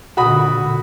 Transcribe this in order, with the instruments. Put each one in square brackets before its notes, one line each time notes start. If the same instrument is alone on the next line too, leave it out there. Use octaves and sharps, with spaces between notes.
[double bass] A#2 D3 [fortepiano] F#4 B5 D#6